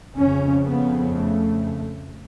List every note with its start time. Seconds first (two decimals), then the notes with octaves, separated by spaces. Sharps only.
0.19 F2 C#3 C#4
0.67 B3
1.14 A3